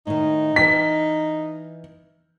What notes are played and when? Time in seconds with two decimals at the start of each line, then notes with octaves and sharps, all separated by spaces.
0.07 A2 D#3 D#4
0.56 E3 G5 B6